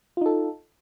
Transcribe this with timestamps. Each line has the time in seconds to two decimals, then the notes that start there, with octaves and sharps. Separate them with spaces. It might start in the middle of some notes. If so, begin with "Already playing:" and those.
0.17 F4
0.21 D#4
0.26 A4